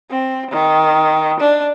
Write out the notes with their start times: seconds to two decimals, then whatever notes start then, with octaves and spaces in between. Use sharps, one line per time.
0.10 C4
0.51 D#3
1.40 D4